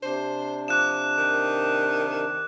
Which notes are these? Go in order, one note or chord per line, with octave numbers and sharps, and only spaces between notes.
C3 D4 C5
F3 D6 F#6 E7
D#3